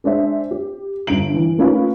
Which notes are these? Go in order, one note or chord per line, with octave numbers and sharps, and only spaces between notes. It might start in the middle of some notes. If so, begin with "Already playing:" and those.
G#3 D4 C5 E5
G4
G1 G2 D7 F#7
E3
A3 A#3 C#4 D#4 F4 B4